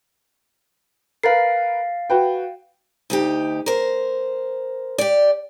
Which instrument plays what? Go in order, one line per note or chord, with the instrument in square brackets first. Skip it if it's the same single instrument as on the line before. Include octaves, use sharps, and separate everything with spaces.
[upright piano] A#4 B4 [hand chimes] F5 A6 C7
[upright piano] F#4 B4 G5
[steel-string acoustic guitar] D2 D#4 G4
A#4 C5
G4 D5